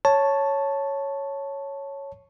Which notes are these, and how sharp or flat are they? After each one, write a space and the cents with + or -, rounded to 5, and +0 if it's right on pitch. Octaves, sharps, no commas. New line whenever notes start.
C#5 +0 A5 +0